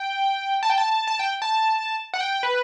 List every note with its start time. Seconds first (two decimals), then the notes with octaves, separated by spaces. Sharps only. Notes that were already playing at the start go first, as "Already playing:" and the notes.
Already playing: G5
0.63 A5
0.70 G5
0.78 A5
1.07 A5
1.19 G5
1.42 A5
2.14 F#5
2.20 G5
2.43 B4